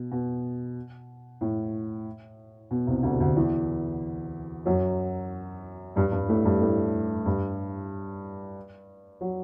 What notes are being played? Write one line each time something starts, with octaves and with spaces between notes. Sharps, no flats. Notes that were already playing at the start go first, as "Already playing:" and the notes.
Already playing: B2
B2
A2
B2
C2 C3
D2 D3
D2 D3
E2 E3
F#2 F#3
G2 G3
G2 G3
A2 A3
G2 G3
A2 A3
G2 G3
F#3